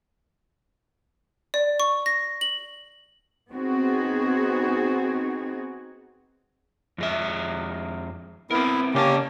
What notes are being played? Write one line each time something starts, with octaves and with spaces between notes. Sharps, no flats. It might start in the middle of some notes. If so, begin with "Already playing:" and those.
D5
C#6
A#6
F#7
B3 C4 D#4 F#4 G#4
F2 G#3 E5
B3 C4 E4 A#4
C#3 A#3 C#4 G4 C5 A5